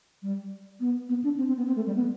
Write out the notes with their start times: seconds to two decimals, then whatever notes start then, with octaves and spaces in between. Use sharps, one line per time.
0.22 G3
0.80 B3
1.09 B3
1.24 D4
1.38 C4
1.48 C4
1.57 B3
1.67 C4
1.76 A3
1.86 G3
1.95 B3